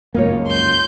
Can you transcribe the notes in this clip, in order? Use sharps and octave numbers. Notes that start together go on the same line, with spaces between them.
C#2 F#2 A#3 D#4 F4 C#5
C6 G6